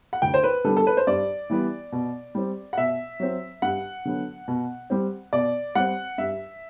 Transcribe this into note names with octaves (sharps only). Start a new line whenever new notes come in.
F#5
D2 G5
C5
B4
D3 G3 B3 A4
A4
B4
C5
G2 D5
E3 G3 B3
B2
G3 C4
F#5
B2 E5
F#3 C4
G2 F#5
D3 F#3 B3
B2
G3 C4
B2 D5
G3 C4 F#5
G2 E5